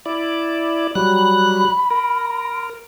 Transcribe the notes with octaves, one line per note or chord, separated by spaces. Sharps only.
E4 D5
F#3 G3 B5 F#6
A#4